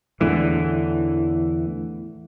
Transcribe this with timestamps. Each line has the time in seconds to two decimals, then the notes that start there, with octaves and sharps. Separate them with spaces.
0.20 E2 A2 D3 E3